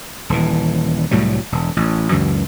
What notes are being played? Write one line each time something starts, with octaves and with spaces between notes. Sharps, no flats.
D#1 E3
C2 A2 F#3 G3
E1
A1
C#2 F#2 E3